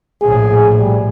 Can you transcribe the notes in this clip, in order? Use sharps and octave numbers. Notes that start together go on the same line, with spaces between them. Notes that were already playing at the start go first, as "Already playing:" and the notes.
A#1 A2 G#4
G3